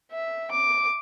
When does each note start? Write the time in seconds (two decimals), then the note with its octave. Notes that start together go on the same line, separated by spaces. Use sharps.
0.12 E5
0.51 D6